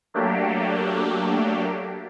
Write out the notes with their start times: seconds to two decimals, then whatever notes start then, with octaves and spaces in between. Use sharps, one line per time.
0.14 F#3 A3 A#3 D4 G4